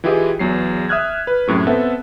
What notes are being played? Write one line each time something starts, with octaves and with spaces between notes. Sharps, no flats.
E3 E4 F4 G4 G#4 D#5
E2 F#3 C7
E5 D#6 F6 F#6 G#6
B4
F#2 A2 C3
B3 C4 A4 E5 F#5